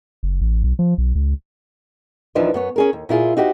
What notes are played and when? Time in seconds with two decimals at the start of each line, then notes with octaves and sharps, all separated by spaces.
0.23 F#1
0.41 A1
0.64 B1
0.79 F3
0.98 B1
1.15 C#2
2.35 D#2 E3 F3 D4 D#4 B4
2.54 F#2 B3 C#5
2.76 C#4 G#4 A#4
2.93 D#2
3.09 A#2 E4 F4 G#4
3.37 D#4 F#4 G4 A#4 C5